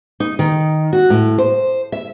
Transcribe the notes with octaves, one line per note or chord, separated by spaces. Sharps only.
D#4
D#3
F#4
A2
C5
E5